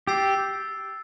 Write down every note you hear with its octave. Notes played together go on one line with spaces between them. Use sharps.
G4 E6 A6 C7